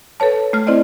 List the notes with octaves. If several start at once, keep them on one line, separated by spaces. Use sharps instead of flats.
A4 B4 C#5 A5
A3 F6
C4 E4 C5 D5 D#5